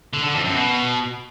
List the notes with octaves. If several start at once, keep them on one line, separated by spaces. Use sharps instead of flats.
D3
D3
F2
F#2
B2